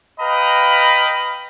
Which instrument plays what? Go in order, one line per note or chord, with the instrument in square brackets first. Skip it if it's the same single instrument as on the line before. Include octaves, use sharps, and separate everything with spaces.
[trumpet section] B4 D#5 F5 G5 A#5 B5